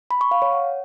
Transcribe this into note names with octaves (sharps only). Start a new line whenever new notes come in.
B5
C#6
F5
C#5
F#5